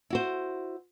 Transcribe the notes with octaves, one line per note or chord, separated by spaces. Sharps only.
E4 F#4 C5